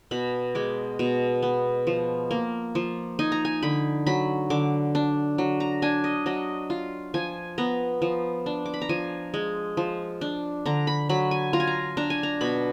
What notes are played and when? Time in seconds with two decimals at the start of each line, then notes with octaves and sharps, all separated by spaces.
0.11 B2 B5
0.55 G#3 D6
0.99 B2
1.43 B3
1.87 F3
2.31 A#3
2.75 F3
3.19 D#4 G#5
3.32 A#5
3.45 G#5
3.62 D3 B5
4.07 F#3 B5
4.50 D3 D6
4.95 D4
5.38 F#3
5.60 A#5
5.82 D4 G#5
6.04 D#5
6.26 F#3 D#5
6.70 F4
7.14 F3 G#5
7.58 B3 A#5
8.02 F3
8.46 D4
8.66 D6
8.74 B5
8.82 A#5
8.89 F3 G#5
9.34 G#3
9.77 F3
10.21 D4
10.66 D3 A#5
10.87 B5
11.09 F#3 B5
11.31 G#5
11.53 F4 A#5
11.60 G#5
11.67 A#5
11.97 D4 A#5
12.10 G#5
12.23 A#5
12.41 B2 B5